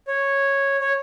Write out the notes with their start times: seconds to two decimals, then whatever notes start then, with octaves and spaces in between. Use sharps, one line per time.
0.07 C#5
0.81 C#5